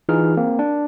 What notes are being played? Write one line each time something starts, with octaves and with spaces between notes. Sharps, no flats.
E3 D#4 F4 G#4 F6
A#3 C4
D4